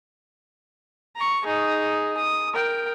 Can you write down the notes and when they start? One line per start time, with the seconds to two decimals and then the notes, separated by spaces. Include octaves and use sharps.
1.16 A#5 C#6
1.44 D#4 G#4
2.17 D#6
2.53 A#4 G5